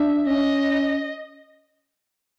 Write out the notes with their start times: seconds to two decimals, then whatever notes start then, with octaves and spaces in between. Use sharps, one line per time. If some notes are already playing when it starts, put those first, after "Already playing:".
Already playing: D4 E5
0.27 C#4 D#5